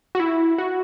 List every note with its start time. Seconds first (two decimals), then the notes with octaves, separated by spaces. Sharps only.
0.15 F#4
0.20 E4
0.58 F#4